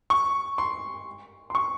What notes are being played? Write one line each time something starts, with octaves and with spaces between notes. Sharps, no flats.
C#6
C6
C6
C#6